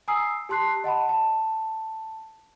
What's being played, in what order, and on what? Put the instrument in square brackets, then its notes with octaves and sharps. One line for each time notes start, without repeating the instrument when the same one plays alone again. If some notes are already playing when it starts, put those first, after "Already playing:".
[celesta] G#5 A#5 D#6 E6 C7
G4 A5 C6 F#6 C7
D#5 F#5 A5 B5
A5